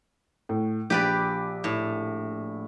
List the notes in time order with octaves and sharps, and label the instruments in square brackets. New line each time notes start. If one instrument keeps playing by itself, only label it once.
[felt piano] A2
[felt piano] A#1 [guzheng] G4 B4 D5
[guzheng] A2